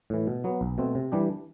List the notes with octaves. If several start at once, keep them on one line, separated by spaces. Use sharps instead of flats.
A2 E3
B2
F#3 B3
B1
B2 A3 C4
C3
E3 G3 D4 G4